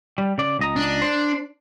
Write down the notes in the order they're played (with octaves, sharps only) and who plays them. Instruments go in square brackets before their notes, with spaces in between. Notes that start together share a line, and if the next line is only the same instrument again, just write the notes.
[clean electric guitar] G3
C#3 D5
C#2 D#5 A#5
[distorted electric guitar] D4
[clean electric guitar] C5